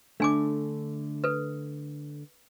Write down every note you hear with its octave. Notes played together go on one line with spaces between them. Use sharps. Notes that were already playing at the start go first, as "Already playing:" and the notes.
D3 A3 D4 G#5 D6
A4 B4